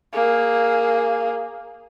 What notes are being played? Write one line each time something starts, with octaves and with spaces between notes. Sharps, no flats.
A#3 G#4